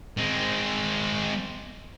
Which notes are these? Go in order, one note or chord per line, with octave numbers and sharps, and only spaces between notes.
G#3 C4